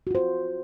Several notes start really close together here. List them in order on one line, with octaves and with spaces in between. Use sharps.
F#4 F4 C5